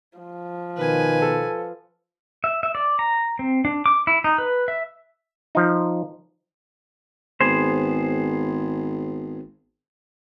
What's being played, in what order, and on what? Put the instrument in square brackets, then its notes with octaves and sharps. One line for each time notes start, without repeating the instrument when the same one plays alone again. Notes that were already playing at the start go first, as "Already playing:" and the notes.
[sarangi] F3
[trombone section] B2 D#3 [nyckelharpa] B4 G#5
[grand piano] A4
[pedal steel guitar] E5
E5
D5
A#5
C4
D4
D6
E4
D#4
B4
E5
[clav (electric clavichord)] F3 D#4
[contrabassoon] G#1 [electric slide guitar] B3 G#4 C5